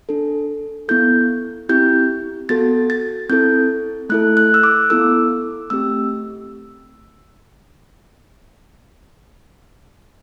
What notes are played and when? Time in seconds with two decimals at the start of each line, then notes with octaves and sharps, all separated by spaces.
0.09 D4 A4
0.88 B3 E4 A4 G6
1.69 C4 E4 G4 G6
2.49 B3 F#4 A4 A6
2.90 A6
3.30 C4 E4 A4 G6
4.09 A3 E4 A4 F#6
4.37 F#6
4.54 E6
4.63 D6
4.90 B3 E4 A4 E6
5.70 A3 C4 G4 E6